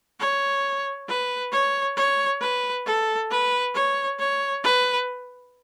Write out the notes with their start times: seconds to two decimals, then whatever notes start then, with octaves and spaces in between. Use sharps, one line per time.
0.20 C#5
1.08 B4
1.52 C#5
1.97 C#5
2.41 B4
2.86 A4
3.31 B4
3.75 C#5
4.19 C#5
4.64 B4